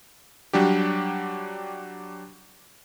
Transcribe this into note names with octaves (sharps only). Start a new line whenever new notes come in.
F#3 G3 D4 G4